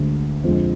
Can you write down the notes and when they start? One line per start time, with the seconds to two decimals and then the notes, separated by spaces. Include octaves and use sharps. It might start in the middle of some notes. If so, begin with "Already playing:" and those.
Already playing: D2 D3 G#3
0.44 F2 D3 F3 G#3